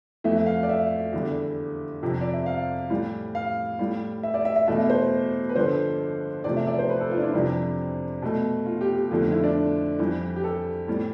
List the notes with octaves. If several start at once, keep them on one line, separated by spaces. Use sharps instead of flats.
F2 E3 A3 E5
F5
D5
E5
E2 D3 G3
F2 C3 F3
D5
E5
F5
A2 E3 G3
F5
A2 G3
E5
D5
E5
E5
E2 B2 A3 E5
C5
B4
G2 D3 F3 C5
E2 C3 F3 A3 D5
E5
D5
C5
B4
A4
F4
D4
E4
F2 C3 E3 G3 D4
B2 A3
F4
G4
G4
F2 D3 A3 F4
F4
E4
D4
F2 E3 G3
G4
A4
A2 E3 G3